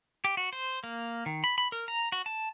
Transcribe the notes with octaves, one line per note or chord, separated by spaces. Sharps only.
G4
F#4
C5
A#3
D#3
B5
B5
A#4
A#5
F#4
A5